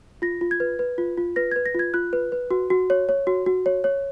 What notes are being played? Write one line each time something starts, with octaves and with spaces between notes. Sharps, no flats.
F4 A#6
F4
G#6
B4
B4
F4
F4
B4 A#6
B4 G#6
A#6
F4 G#6
F4 F#6
B4
B4
F#4
F#4
C#5
C#5
F#4
F#4
C#5
C#5